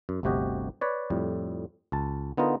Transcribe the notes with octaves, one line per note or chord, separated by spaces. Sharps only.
F#2
G1 D2 C3 F#4 G4 D#5
B4 C#5 D5
F2 A2 G3
C#2 A5
D3 B3 D#4 F4 A#4